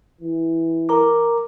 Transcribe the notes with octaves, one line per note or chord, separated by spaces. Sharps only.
E3
A#4 A#5 D6